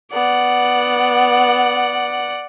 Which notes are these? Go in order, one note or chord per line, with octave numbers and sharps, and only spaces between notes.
B3 D5 F#5